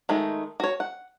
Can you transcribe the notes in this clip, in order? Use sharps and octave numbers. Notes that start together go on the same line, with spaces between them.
D#3 G#3 A3 D#4
F#4 C#5
F#5